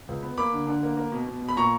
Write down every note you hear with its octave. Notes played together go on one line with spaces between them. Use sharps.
C#2
B3
A#3 B5 D6
D3
D3
A#3
A#3
B2
B2
B2
B5
A#2 A#5 C#6